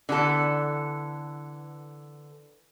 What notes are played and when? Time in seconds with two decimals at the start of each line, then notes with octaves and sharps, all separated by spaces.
0.09 D3 E3 B3 A4